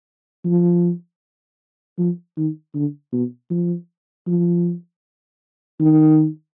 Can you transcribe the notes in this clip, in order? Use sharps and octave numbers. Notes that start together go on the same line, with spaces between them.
F3
F3
D#3
D3
B2
F3
F3
D#3